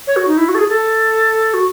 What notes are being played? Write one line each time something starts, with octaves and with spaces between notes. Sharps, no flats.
C#5
F#4
D#4
E4
F#4
A4
G#4
A4
F#4